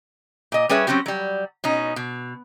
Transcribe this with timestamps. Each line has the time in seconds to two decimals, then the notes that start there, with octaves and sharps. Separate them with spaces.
0.52 A#2 D#5
0.69 G3 C#4 G#4 B4 C#5 E5
0.87 F#3 C4 C#4 F#4 G4
1.06 F#3 G3
1.64 B2 C#4 D#4
1.96 B2